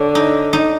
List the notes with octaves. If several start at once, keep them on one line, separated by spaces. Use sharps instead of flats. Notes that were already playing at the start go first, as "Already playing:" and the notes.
Already playing: D3 C#5
D#4
D#4